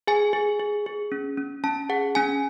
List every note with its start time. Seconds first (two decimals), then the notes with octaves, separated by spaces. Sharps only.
0.07 G#4 G#5
0.33 G#4
0.60 G#4
0.86 G#4
1.12 C#4
1.38 C#4
1.64 C#4 A5
1.89 G#4 F#5
2.15 C#4 G#5